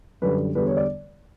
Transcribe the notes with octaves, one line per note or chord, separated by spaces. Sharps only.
F#2 D3 G3 B4
E2 D3 G3 B4
C#5
D5